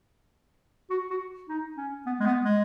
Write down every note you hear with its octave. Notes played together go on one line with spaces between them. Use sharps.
F#4
F#4
D#4
C#4
B3
G#3
B3
G#3